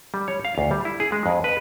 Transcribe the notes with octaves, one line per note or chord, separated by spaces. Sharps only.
G3
C#5
F5
D2
G3
E4
G#4
G#3
F2
B4